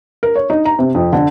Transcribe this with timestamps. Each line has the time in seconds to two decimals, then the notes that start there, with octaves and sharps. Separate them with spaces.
0.23 A#4
0.36 C#5
0.50 D#4
0.65 A#5
0.79 C3
0.95 F2
1.13 D3